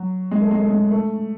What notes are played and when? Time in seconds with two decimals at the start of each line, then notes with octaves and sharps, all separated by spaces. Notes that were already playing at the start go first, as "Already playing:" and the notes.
Already playing: F#3
0.31 G#3
0.41 A3
0.51 G#3
0.60 A3
0.70 G#3
0.91 A3